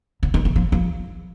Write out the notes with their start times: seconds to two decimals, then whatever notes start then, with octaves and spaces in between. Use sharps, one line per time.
0.23 D3
0.34 D#3
0.45 E3
0.56 F3
0.72 F3